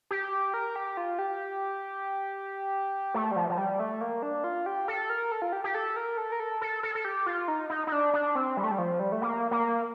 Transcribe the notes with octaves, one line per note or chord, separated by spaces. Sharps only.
G4
A#4
G4
F4
G4
A3
G3
F3
F3
G3
A3
A#3
D4
F4
G4
A4
A#4
A4
F4
G4
G4
A4
A#4
A4
A#4
A4
A4
A4
A4
G4
F4
D#4
D#4
D#4
D4
D4
C4
G3
A3
G3
F3
G3
A3
A#3
A#3